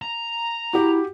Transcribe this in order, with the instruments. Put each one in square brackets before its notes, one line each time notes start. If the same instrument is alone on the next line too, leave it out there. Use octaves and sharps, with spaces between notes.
[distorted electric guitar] A#5
[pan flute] E4 [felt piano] F#4 G4